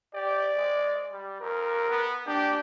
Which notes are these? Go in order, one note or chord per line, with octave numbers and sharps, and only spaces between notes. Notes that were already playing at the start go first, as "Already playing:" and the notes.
G4 D5
G#3
G3
F2 A#4
B3
D4 G4